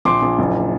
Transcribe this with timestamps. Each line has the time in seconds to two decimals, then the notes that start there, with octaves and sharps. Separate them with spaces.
0.05 A#1 C6 D6
0.22 A#1
0.39 F#1